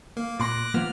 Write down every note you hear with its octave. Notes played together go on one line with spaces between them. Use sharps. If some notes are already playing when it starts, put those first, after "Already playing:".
A#3
A#2 C6 D6 F#6 A#6
F3 A#3 B3 F6